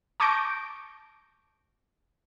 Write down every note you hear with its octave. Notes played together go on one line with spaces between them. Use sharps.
A5 C#6 D6 G6 A#6 D7